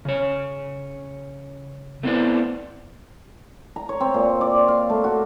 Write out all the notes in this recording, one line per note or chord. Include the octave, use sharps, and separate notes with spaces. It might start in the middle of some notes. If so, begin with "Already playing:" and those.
C#3 C#5
A3 B3 C4 E4 B4 D5
A#5
C#5
C4
A#2
D5
F5
A3
F#4